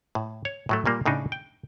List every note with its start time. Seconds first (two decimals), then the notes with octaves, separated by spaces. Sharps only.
0.15 A2
0.45 C#5
0.69 A2 F#3 A3
0.86 A#2 G3 A#3
1.06 A2 C#3 D4 D#4
1.32 G5